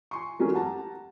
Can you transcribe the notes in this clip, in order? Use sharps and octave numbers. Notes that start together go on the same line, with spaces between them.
G#5 C6 C#6
E3 F#3 G#3 A3 C#4 A#4
G4 F#5 A5 A#5